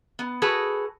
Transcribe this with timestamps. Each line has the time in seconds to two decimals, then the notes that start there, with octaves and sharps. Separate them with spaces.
0.19 B3
0.42 F#4 G#4 A4 B4